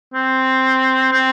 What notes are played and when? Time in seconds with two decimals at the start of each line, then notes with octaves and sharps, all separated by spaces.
0.14 C4
1.12 C4